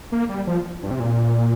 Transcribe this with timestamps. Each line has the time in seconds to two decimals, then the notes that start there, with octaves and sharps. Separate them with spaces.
0.12 A#3
0.29 G3
0.47 F3
0.83 G2
0.91 C3
1.00 A#2